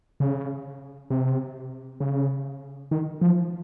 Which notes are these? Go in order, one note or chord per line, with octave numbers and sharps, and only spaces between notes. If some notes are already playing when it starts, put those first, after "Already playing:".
C#3
C3
C#3
D#3
F3